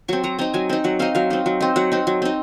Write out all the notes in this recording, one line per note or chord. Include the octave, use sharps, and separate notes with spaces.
F#3 C4 C#6
F#3 A#5
C4 D#4 A#5
F#3 G#5
C4 D#4
F#3 F#5
C4 D#4 F5
F#3 F5
C4 D#4
F#3
C4 D#4
F#3 F#5
C4 D#4
F#3
C4 D#4